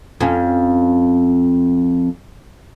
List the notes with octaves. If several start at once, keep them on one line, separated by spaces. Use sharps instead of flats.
F2 C#4